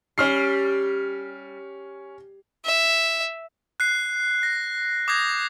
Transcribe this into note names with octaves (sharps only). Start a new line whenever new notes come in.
G3 C#4 F6 C7
E5
F#6 C7
A#6
D6 D#6 G6 G#6 A#6